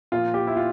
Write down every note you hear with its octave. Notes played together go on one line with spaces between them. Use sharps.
A#2 F3 F4
G4
E4
F4